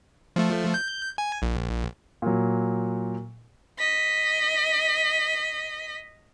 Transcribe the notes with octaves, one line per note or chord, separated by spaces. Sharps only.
F3 A3
G6
G#5
A#1
A#2 F#3
D#5 B6